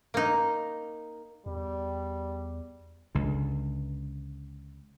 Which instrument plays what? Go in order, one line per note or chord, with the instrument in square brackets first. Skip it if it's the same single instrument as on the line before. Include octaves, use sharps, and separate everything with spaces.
[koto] A#3 D#4
[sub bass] E2 [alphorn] G3
[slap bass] C#2 D3